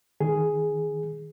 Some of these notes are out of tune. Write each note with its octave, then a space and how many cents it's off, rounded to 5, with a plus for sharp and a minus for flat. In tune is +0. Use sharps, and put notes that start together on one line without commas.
D#3 +0 G#4 +0